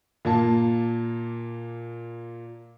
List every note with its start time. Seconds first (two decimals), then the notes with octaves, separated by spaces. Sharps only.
0.25 A#2 A#3 A5